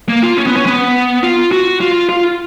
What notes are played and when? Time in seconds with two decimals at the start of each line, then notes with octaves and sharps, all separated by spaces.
0.09 A#3
0.23 F4
0.37 C#4
0.47 B3
0.56 C#4
0.66 B3
1.23 F4
1.52 F#4
1.81 F4
2.09 F4